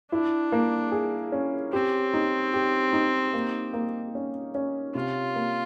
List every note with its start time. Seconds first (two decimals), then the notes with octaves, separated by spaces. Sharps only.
0.12 D4 E4
0.52 A#3
0.92 G#4
1.32 C#4
1.72 C4 G4
2.14 D#4
2.54 G4
2.93 D#4
3.34 A#3
3.73 A#3
4.15 C#4
4.55 C#4
4.95 C3 F4
5.35 A#3